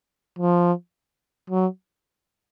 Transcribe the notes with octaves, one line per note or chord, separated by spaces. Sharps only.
F3
F#3